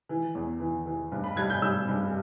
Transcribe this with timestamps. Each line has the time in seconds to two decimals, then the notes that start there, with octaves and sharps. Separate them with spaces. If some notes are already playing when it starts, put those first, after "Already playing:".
0.09 E3
0.35 E2
0.60 E3
0.86 E3
1.12 G2
1.24 B5
1.36 G3 G#6
1.50 G6
1.62 G3 E6
1.88 G2